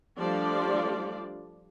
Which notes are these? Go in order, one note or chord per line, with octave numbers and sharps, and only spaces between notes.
F3 G3 A3 D4 F4 D5